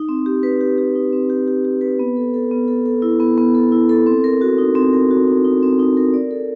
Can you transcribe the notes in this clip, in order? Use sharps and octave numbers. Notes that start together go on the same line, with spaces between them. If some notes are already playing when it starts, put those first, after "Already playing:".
Already playing: D#4
C4
G4
B4
G4
G4
D#4
C4
G4
G4
G4
B4
B3
A4
A4
B3
A4
A4
E4
B3
B3
A4
E4
A4
C4
A#4
F#4
D#4
C4
A#4
F#4
D#4
D#4
C4
D#4
A#4
D5
A4